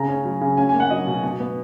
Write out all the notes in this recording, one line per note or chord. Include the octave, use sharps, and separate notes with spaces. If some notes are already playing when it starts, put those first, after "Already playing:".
Already playing: C#3 A#5
C#4
F#3
C#3
C#4 G#5
G#5
A#3
F#5
F#3 D#5
B2
B2
B3